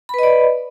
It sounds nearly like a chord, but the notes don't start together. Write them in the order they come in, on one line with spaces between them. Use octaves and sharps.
B5 B4 D#5 D5